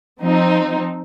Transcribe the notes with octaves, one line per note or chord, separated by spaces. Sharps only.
F3 C4 D#4